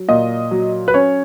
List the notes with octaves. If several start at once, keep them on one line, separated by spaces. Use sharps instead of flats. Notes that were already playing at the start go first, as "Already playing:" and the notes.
Already playing: F#3
A#2 D#5
F#3
B4
C#4 C#5